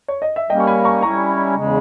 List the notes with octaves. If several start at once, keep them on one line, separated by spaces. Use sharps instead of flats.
C#5
D#5
E5
G3 A#3 C#4 D#5 G5
C#6
G#5 B5
A#5 C#6
G3 C#4 E4 A#5 C#6
E2 C#3 G#3